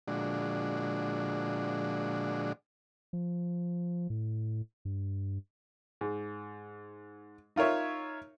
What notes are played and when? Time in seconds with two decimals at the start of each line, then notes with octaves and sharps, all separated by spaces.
0.08 A#2 D3 F3 G#3 D4 F#4
3.13 F3
4.10 A2
4.85 G2
6.01 G#2
7.56 D#4 F4 A#4 C#5 E5